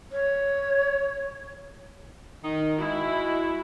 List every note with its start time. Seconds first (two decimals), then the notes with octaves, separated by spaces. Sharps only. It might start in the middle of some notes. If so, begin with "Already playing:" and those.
0.12 C#5
2.44 D#3 D#4
2.79 G#3 E4 F#4